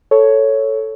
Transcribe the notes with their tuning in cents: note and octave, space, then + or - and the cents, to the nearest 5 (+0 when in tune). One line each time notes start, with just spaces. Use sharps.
A4 +0 C#5 +0